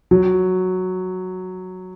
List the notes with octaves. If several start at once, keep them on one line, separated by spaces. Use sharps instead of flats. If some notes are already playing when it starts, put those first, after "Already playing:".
F#3